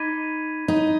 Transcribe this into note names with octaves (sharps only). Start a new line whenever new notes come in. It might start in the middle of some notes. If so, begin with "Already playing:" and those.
Already playing: D#4 B5 D6 G#6 B6 D#7
D#4